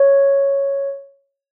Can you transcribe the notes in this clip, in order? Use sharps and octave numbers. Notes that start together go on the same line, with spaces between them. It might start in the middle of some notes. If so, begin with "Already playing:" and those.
Already playing: C#5